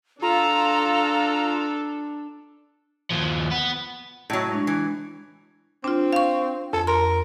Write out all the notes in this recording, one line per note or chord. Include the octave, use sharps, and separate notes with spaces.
D4 F4 A4 A#5
D#2 F3
B3
A2 F#3 D#5
G#3 D4
E3
C4 D4 F4
F5 C#6
F2 A4
A#4 C6